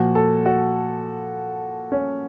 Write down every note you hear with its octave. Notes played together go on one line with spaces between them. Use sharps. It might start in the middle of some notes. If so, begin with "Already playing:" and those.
Already playing: A#2 F3 F#4
A4
F#4
C#4